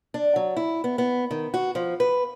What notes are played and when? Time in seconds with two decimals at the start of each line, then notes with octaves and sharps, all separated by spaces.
0.14 D4
0.36 F#3
0.57 E4
0.84 B3
0.98 B3
1.31 D#3
1.54 F#4
1.75 F3
2.00 B4